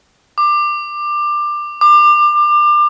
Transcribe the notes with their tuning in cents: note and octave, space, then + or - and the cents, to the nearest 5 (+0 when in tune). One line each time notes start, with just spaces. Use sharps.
D6 +20
D6 +30